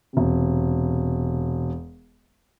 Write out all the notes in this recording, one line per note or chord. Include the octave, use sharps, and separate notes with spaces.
E1 C3